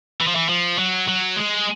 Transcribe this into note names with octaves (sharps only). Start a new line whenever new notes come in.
E3
F3
E3
F3
F#3
F#3
G#3